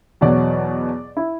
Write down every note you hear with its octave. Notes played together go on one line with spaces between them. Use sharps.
E2 B2 F#3 D5
E4